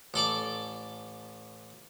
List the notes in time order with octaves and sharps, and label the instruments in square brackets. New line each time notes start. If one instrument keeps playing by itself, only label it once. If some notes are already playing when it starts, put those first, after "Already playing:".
[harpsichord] A1 A4 D5 D6